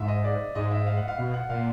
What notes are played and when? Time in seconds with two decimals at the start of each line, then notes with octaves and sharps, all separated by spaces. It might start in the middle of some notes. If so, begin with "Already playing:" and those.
Already playing: G#2 E5
0.08 D#5
0.24 D5
0.55 G#2 D#5
0.71 E5
0.87 F5
0.97 F#5
1.08 F5
1.18 B2 F5
1.34 F#5
1.49 A#2 F5